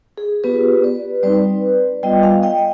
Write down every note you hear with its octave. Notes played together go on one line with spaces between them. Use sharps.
G#4
B3 F4 G4 B4
B4 D5
G3 C4 D#4 B4 D5
G3 B3 F4 D#5 G5
F5 G#5
D#5 G5